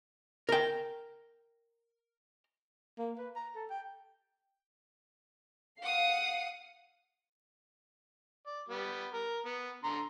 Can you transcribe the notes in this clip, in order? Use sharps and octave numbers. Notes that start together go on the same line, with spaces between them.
A#4 G5
A#3
B4
A#5
A4
G5
F5 F#5 D#6 C7
D5
G3 B3
A#4
B3
D3 A#5 C6